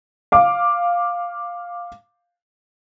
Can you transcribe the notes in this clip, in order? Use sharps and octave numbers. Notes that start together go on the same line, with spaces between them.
F5 D6